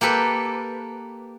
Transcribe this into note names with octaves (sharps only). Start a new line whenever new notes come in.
A#3 G4 A4 B4